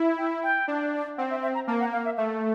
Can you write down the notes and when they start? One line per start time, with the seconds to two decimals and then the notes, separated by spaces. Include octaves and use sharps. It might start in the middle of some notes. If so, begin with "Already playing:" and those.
Already playing: E4
0.18 G5
0.43 G5
0.68 D4
1.18 C4 F#5
1.30 E5
1.42 E5
1.55 A#5
1.67 A#3 A5
1.80 F#5
1.92 F5
2.05 E5
2.17 A3 E5